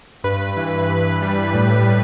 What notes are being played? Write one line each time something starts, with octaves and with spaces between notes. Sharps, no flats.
G2 B4
E3
G2
G3
A2
A2